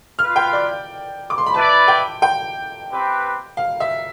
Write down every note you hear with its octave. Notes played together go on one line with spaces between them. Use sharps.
F4 B4 F5 F6
G5
D5
D6
C6
B5
E4 B4 D5 A5
G5
G5
C4 G4 B4
F5
E5